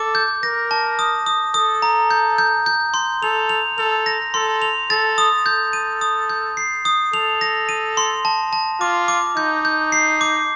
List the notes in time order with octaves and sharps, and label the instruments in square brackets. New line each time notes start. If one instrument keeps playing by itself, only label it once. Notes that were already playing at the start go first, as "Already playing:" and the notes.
Already playing: [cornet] A4 [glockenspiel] D6
[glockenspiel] G6
[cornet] A#4 [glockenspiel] A#6
[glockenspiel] A5
D#6
D#6
[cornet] A4 [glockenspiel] D#6
[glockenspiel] A#5
G6
G6
G6
C6
[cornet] A4 [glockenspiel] F7
[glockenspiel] F7
[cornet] A4 [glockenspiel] F7
[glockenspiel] A#6
[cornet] A4 [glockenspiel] C6
[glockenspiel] F7
[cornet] A4 [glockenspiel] A6
[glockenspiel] D#6
[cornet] A4 [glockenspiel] G6
[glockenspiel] D#7
D#6
G6
C7
D#6
[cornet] A4 [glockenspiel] F7
[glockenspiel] A#6
D#7
C6
A5
A5
[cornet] F4 [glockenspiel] D6
[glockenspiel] D6
[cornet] D#4 [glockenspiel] G6
[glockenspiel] G6
C7
D6